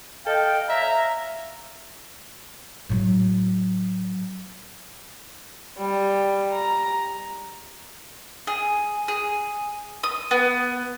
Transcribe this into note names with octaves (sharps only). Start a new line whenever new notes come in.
A4 D#5 F5 G5
C#5 E5 A#5
A2 F#3
G3
A#5
G#4
G#4
D#6
B3